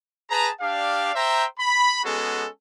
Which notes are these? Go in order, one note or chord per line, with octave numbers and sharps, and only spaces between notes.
G#4 B4 A5 A#5
D4 G4 D5 F5
C5 E5 G5 A#5
B5
G#3 B3 C#4 F#4 G#4 A4